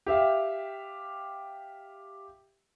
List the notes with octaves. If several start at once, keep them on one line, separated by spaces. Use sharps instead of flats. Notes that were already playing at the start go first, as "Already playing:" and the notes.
G4 E5 F5